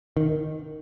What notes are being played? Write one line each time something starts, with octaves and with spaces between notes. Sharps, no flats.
D#3